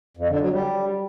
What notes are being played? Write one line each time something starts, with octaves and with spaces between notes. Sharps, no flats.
F2
D3
F#3
G3